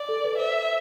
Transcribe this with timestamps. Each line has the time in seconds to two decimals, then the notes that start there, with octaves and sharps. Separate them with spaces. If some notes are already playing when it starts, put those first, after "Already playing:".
Already playing: D5
0.09 A4
0.24 B4
0.38 C5 E5